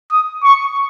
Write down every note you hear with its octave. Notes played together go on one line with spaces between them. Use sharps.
D#6
C#6